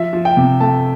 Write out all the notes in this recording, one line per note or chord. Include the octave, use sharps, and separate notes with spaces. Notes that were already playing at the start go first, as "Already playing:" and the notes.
Already playing: F3 E5
F3
G5
C3
A3 A5